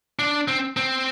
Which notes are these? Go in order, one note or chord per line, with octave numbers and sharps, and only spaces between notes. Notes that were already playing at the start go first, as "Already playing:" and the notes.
D4
C4
C4